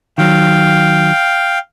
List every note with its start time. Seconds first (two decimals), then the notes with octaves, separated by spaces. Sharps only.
0.18 D#3 F#3 F5 G5